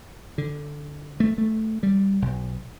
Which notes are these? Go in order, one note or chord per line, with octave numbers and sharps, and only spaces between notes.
D3
A3
A3
G3
B1